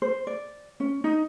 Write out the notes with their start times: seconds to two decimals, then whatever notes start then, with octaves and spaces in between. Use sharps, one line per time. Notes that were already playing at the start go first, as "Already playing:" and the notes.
0.02 C5
0.27 D5
0.80 C#4
1.04 D#4